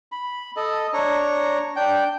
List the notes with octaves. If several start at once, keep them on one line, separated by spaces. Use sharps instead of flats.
B5
A4 D#5
D4 C#5 A#5
D4 G5